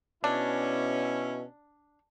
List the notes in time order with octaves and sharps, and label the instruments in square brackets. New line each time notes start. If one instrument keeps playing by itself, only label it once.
[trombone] B2 [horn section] C#4 E4 [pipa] D4